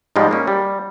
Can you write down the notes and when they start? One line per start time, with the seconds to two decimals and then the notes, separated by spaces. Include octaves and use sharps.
0.16 G#2 F3 G3 G#3
0.31 A#3 C#4
0.47 G3